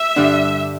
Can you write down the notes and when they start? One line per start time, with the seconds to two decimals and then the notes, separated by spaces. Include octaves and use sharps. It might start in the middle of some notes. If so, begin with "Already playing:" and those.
Already playing: E5
0.16 G2 D3 G3 D4